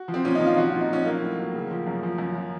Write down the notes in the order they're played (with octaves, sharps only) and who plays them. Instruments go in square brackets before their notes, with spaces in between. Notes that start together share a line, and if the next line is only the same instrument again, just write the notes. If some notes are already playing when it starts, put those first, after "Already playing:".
Already playing: [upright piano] F#4
F3
C4
A#2 C#4
D#4
F3
F4
F3 F#4
F4
A#2
D#4
F3 C#4
F#3 A#3
A2
F#3
C#3
F3
F#2
F3
F#2
F3